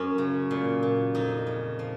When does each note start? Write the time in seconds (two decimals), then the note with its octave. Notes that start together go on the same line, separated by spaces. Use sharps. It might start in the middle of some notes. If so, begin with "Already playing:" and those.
Already playing: F#2 C#4
0.18 C#3
0.51 A#2
0.83 A#2
1.15 F2 D#4
1.47 C#3
1.79 F3